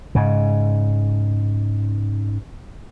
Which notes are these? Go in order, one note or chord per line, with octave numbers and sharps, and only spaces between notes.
G#2 C#3